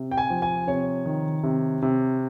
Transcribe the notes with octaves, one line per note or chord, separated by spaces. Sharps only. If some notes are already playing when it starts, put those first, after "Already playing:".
Already playing: C3
G5
G#5
F3
G#5
C3 C#5
D#3
C3
C3